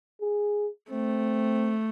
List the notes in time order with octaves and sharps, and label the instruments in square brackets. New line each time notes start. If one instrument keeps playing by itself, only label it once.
[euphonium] G#4
[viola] A3 [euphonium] C4